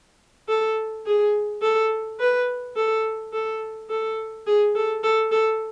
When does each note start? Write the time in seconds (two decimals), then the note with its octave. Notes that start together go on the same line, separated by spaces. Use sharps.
0.49 A4
1.06 G#4
1.62 A4
2.19 B4
2.76 A4
3.33 A4
3.90 A4
4.47 G#4
4.75 A4
5.03 A4
5.32 A4